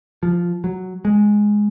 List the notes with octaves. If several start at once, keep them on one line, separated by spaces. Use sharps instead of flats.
F3
F#3
G#3